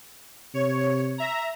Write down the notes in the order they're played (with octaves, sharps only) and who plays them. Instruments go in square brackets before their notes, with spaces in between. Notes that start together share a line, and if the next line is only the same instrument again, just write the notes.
[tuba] C3 [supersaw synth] C#5
[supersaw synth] E5 A#5